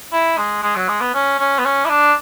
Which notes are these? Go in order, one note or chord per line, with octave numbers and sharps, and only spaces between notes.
E4
G#3
G#3
F#3
G#3
B3
C#4
C#4
B3
C#4
E4
D4